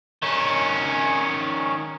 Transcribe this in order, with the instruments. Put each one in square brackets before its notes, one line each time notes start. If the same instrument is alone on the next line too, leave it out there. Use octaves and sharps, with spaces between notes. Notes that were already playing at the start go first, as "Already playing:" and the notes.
[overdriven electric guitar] D#3 C#4